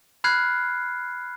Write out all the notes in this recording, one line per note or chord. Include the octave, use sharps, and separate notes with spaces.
B5 F6 F#6 G#6 C7